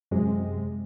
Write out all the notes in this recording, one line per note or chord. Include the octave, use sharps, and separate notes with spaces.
F#2 C3 G#3